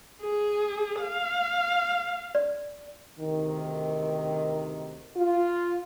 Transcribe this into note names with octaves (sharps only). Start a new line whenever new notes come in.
G#4
F5
D5
D2 C3 D#3
F4